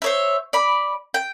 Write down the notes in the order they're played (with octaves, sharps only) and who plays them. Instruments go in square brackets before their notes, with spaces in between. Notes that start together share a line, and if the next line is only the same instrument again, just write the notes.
[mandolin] C5 C#5 E5
D5 B5
G5